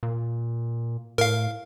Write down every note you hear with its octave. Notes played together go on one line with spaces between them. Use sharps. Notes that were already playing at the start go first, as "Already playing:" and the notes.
A#2
A2 A#4 F5